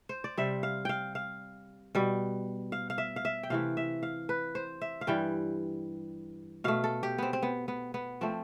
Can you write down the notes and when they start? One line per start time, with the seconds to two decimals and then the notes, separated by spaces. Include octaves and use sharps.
0.09 C5
0.24 D5
0.37 C3 G3 E5
0.63 F5
0.85 F5 G5
1.15 F5
1.95 B2 G3
2.72 F5
2.90 F5
2.98 E5
3.16 F5
3.25 E5
3.43 G5
3.50 C3 E3 A3 F5
3.77 E5
4.03 F5
4.29 B4
4.55 C5
4.81 E5
5.01 F5
5.07 G2 E3 G3 G5
6.64 B2 A3 F5
6.84 A4
7.03 G4
7.18 B3 C4
7.33 C4
7.42 B3
7.68 B3
7.94 B3
8.21 F3 A3 C4